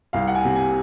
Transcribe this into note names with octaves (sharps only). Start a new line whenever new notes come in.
C2 F5
F#5
G#5
C3
G#5